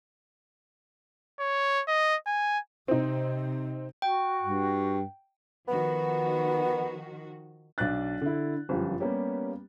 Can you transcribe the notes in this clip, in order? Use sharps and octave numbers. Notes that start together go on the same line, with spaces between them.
C#5
D#5
G#5
C3 C4 D#4
F#4 G5
G2
D#3 F3 B3 F#4
B1 D4 D5 F#6 A6
D3 E4
G1 F#2 F3 G4
G3 A#3 B3 C#4 G4